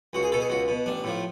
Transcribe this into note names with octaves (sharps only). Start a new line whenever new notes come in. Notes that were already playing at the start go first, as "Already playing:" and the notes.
C#2 F#4
G#4
B2 A4
G#4
C#2 F#4
B2
A1 D4
A2 F3